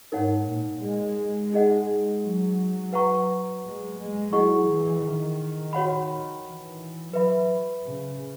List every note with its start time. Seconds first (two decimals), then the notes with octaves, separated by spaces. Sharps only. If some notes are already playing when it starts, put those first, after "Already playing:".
0.12 G#2 D#4 A#4 C#5 F#5
0.47 A#2
0.82 G#3
1.52 D#4 G#4 D#5 F#5
2.22 F#3
2.93 B4 F#5 A#5 C#6
3.63 G#3
3.98 G#3
4.33 F#3 E4 G#4 D#5 F#5 C#6
4.68 E3
5.03 D#3
5.73 F#4 C#5 F#5 B5
6.43 E3
7.13 F#3 B4 E5 B5
7.83 C#3